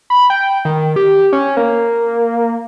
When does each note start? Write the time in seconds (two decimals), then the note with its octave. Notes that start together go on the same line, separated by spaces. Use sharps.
0.10 B5
0.30 G5
0.65 D#3
0.96 G4
1.33 C#4
1.57 A#3